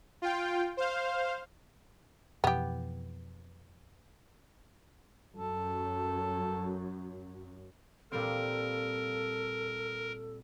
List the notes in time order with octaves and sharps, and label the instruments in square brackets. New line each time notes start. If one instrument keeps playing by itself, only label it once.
[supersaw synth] F4 G5
C5 F5
[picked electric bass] F2 B2 E3 [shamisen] B3 G4
[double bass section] F#2 [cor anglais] A4
[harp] A#2 G3 C4 [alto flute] A4 [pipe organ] A#4